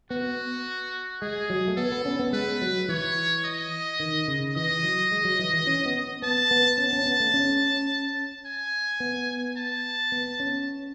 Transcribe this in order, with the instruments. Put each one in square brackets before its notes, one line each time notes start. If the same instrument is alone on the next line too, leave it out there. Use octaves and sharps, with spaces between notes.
[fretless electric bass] B3 [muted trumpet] F#4
[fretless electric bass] G#3 [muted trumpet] G#4
[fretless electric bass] F#3
A3
[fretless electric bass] B3 [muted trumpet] A4
[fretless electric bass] B3
C#4
B3
[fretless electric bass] G#3 [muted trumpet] B4
[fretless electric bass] F#3
[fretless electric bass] E3 [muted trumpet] C#5
[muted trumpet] D#5
[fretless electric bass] D#3
C#3
[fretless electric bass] E3 [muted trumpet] D#5
[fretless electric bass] F#3
G#3
F#3
E3
E3
C#4
B3
[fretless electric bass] B3 [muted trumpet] A5
[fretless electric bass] B3
[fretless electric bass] C#4 [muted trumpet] A5
[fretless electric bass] C#4
B3
A3
C#4
[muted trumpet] G#5
[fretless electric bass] B3
[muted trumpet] A5
[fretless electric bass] B3
C#4